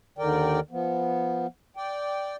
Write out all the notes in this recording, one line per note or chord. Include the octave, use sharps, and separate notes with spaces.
D#2 D3 D#3 A#4 D5 G5
F3 B3
D5 G5